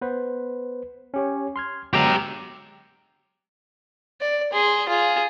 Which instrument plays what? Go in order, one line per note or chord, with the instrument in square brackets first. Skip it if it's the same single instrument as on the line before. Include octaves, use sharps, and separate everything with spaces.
[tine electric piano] B3 B4 C5
C#4 G4 C#5
C6 F6 G#6
[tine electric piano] F#3 G#3 B3 [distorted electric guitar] G4 A#5
[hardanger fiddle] D5
G#4 C6
F4 G#4